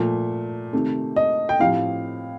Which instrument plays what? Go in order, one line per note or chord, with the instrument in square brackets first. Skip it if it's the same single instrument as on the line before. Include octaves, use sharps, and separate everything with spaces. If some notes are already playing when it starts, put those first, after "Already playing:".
Already playing: [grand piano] A#2 F3 A3
C3 D#3 A3
[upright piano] D#5
G5
[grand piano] A2 F3 C4 G4 [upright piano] F5